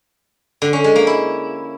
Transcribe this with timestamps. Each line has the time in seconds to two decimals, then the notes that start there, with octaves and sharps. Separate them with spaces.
0.62 D3
0.73 C#4
0.84 G#3
0.96 A#3
1.07 E4